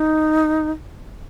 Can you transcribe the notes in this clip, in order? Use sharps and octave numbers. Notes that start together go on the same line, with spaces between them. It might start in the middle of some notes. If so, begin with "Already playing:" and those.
Already playing: D#4